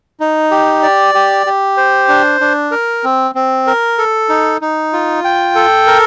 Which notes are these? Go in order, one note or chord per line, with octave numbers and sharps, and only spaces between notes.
D#4
G4
D5
G4
G4
C5
D4
D4
A#4
C4
C4
A#4
A4
D#4
D#4
F4
G5
A4
A#4